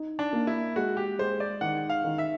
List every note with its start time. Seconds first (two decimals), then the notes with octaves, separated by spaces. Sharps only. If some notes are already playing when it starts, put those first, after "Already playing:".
Already playing: D#4
0.19 D4
0.33 A#3
0.47 E4
0.76 G#3 F#4
0.97 G4
1.19 G#3 C5
1.40 D5
1.61 D#3 F#5
1.90 F5
2.04 D#3
2.18 E5